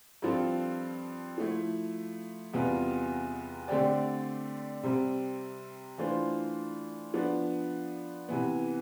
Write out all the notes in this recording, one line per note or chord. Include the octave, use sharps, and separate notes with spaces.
G2 F3 C4 F4 A4
F3 A3 E4
E2 C3 G3 B3 F4
D3 A3 C4 G4 D5
C3 G3 C4
E3 A3 D4 F4 C5
F3 B3 D4
C3 E3 B3